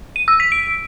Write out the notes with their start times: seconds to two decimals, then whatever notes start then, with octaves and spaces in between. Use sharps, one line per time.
0.16 D#7
0.28 E6
0.40 B6
0.52 D7